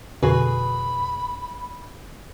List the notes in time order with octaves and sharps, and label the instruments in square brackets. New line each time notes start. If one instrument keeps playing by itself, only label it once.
[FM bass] F2 [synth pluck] B2 D3 F#4 [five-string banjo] G#4 B4 [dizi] B5